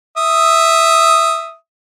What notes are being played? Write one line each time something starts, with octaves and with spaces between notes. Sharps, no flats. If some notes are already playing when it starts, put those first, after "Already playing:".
E5 D#6